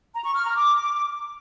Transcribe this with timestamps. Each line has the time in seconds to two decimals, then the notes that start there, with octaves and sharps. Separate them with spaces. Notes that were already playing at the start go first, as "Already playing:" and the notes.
0.15 A#5
0.25 C#6
0.35 F6
0.46 A#5
0.56 D6